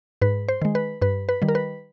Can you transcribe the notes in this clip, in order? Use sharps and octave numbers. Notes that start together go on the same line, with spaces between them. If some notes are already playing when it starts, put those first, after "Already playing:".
G#2 B4
C5
D#3 G#3
B4
G2 B4
B4
D#3 G3
A#4
B4